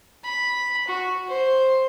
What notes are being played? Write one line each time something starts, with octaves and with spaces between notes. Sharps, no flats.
B5
F#4
C5